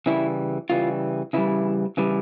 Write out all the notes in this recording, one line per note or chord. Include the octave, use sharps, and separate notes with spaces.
C#3 E3 G3 E4
C#3 E3 G3 F4
C#3 E3 G3 E4
C#3 E3 G3